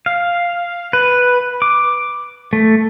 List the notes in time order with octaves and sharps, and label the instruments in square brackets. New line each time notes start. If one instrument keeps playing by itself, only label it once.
[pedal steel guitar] F5
B4
D6
A3